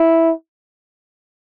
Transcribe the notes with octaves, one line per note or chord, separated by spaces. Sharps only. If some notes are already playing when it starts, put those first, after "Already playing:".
Already playing: E4